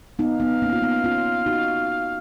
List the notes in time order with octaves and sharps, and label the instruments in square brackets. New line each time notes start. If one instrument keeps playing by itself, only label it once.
[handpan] B3 D#4 [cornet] F5
[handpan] B3 D#4
A#3 C#4
F4
B3 D#4
C#4 F4
D#4 F#4